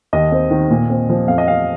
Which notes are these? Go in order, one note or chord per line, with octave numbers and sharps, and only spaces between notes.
D#2 D#5
C4
D#3
A#2
C4
F3
F2 F5
D#5
C4 F5